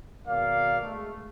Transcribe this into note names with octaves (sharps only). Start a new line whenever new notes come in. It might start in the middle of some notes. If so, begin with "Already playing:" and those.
G#1 B2 A#4 D5 F5
G#3 A3